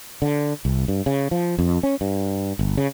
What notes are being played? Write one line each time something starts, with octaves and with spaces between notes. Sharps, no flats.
D3
C2
G2
C#3
F3
F2
C#4
G2
G1
C#3